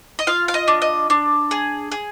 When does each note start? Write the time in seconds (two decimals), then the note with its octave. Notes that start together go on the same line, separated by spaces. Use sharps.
0.19 D#5
0.27 F4 F5
0.48 F5
0.54 D#5
0.68 D4
0.82 D#5
1.10 D4
1.51 G#4
1.92 G#4